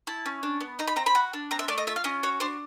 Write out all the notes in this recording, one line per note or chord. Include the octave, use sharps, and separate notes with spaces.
E4 A5
C#4
D4
B3
D#4 A#5
B5
C4 A#5
B5
F#4
D4
C4 A#5
E5
A3 D5
D#5
F4 E5
F5
C#4 D#5
F#4 C#5
D4 C5